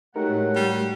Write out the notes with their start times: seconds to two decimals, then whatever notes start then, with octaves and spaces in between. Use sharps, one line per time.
0.16 A2 F#3 G#3 A3 D#4 G4 A#4 F#5
0.56 G3